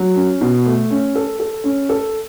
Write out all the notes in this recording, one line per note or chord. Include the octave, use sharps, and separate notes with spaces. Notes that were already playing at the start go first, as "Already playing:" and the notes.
Already playing: F#3
C#4
B2
A3
C#4
A4
A4
C#4
A4